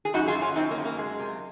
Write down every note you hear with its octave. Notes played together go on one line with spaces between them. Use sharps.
G#4
F#2 D#4 F#4
F4 G#4
F#2
C#4 F4
F#2 C4 D#4
A#3 C#4
F#2
A#3
G#3
C3